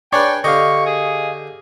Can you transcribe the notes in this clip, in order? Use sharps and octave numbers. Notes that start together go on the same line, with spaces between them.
D4 G#4 B4 C#5 D5 G5 C#6
D3 G4 D#5 F5 C#6
G#4